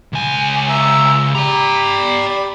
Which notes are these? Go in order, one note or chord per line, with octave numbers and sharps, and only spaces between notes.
C#2 G#5
E5 A#5 E6
G4 D5 A#5 B5